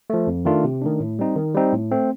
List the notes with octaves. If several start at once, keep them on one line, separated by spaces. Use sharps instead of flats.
F3 A3
F2
D#3 A3 D4 F4
C3
D#3 A3 D4
A2
G3 C4 D#4
D#3
G3 C4 D#4
A2
A3 C4